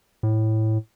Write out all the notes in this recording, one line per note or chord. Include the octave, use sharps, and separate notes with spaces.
A2